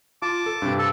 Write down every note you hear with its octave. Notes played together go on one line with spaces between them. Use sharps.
F4 A5 D6
A4
G2 C3
A4